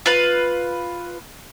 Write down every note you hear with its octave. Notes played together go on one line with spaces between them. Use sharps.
F4 B4